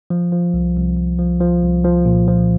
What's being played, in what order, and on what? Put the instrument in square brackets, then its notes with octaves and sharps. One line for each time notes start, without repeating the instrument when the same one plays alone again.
[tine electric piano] F3
F3
C2
C2
C2
F3
F3
C2
F3
A#2
F3